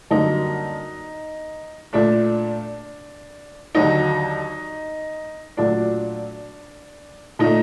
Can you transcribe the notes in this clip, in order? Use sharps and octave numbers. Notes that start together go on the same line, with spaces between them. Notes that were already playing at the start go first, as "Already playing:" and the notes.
F#2 D3 G3 A#3 D#4
A#2 A3 D4
D#2 D3 F#3 D#4
A#2 F#3 A3 D4
A#2 A3 D#4